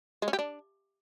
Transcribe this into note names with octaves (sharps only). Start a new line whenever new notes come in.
G#3
C#4
G4
D4